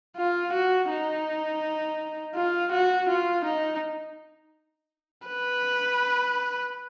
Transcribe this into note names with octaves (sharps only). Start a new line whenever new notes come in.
F4
F#4
D#4
F4
F#4
F4
D#4
B4